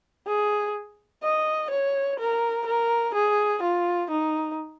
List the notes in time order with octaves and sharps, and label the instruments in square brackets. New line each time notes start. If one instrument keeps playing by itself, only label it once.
[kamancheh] G#4
D#5
C#5
A#4
A#4
G#4
F4
D#4